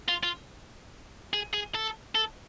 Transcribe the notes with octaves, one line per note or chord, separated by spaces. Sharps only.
F4
F4
G#4
G#4
A4
A4